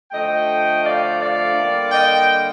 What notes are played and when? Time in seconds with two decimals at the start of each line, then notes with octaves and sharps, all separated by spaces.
0.12 D3 F3 A3 D#5 G5
0.83 D5 F5
1.18 D5 F5
1.54 D3 G3 A#3
1.90 D#5 G5